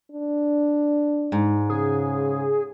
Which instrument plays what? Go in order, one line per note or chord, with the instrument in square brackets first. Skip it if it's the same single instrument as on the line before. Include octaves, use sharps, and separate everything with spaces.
[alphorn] D4
[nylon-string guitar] G#2
[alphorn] C#3 [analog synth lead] G#4